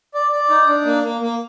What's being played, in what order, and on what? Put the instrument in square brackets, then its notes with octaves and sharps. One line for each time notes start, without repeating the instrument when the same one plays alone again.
[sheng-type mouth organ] D5
D5
D#4
D4
A#3
A#3
A#3